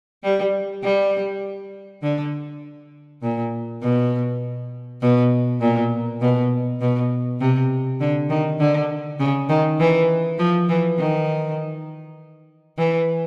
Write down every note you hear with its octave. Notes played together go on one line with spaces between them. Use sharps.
G3
G3
D3
A#2
B2
B2
A#2
B2
B2
C3
D3
D#3
D3
C#3
D#3
E3
F3
E3
D#3
E3